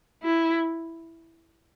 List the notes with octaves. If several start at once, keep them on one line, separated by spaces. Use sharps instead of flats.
E4